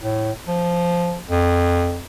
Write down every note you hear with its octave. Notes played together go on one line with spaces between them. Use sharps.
A2
F3
F2